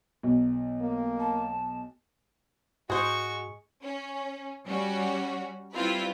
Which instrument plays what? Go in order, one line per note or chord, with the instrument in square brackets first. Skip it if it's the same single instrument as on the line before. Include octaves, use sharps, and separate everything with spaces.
[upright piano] B1
[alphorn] A#3
[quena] A5
[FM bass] G#2 [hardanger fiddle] G#3 C#6 [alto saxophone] F#4 [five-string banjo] G#4 C5
[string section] C#4
G3 C#4 F#4
G3 C4 E4 F4 B4